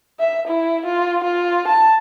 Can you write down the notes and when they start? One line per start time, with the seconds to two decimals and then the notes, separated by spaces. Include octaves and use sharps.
0.20 E5
0.48 E4
0.86 F4
1.24 F4
1.67 A5